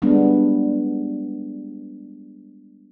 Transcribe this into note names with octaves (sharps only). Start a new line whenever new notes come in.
G3 G#3 B3 D4